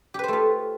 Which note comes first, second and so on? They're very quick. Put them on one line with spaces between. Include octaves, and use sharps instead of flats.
G4 B4 C5 A3 F4